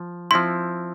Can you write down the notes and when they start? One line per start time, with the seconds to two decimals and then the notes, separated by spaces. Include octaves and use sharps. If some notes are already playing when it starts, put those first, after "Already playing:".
Already playing: F3
0.31 F3 C4 E4 C6